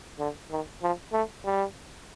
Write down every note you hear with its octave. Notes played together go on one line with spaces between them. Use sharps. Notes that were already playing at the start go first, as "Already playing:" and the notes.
D3
D#3
F3
A3
G3